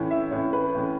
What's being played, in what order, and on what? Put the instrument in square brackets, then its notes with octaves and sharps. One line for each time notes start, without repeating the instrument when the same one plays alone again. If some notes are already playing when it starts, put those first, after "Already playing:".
Already playing: [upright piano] A2 E3 C#4
E5
A2 E3 C#4 C#5
B4
A2 E3 C#4